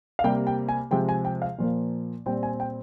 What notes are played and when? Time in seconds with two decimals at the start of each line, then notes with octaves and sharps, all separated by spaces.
0.19 F5
0.24 C3 G3 A#3 G5
0.47 G5
0.69 G#5
0.91 C3 F3 G#3 G5
1.09 G#5
1.25 G5
1.42 F5
1.58 A#2 F3 A#3
2.26 A#2 G3 C4 G5
2.43 G#5
2.60 G5